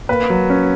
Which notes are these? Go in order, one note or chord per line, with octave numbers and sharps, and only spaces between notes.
A#3 B4
F#3
C#4